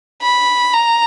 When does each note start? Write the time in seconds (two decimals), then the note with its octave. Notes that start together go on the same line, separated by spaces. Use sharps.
0.22 B5
0.74 A#5